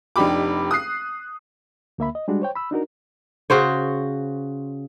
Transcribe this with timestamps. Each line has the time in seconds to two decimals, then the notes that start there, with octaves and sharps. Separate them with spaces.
0.16 F1 D4 D#4 G4 B5 D6
0.71 D#6 F#6 C7
1.98 D2 A#3 E5 B5
2.15 D#5
2.28 G3 G#3 D4 F#4
2.42 C5 C#5 G5
2.55 B5 E6
2.71 D4 D#4 F#4 A#4
3.50 C#3 F#4 C5 C#5